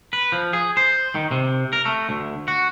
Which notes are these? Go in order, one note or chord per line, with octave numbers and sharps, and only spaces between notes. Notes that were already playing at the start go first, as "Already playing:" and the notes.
B4
F3
G#4
C5
D#3
C3
A#4
A3
D2
F#4